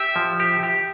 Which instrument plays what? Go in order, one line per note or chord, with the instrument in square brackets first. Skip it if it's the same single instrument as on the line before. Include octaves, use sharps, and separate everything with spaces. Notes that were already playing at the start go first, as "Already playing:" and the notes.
Already playing: [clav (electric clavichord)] G4 [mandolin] E5
[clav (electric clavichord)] F3
G4
G4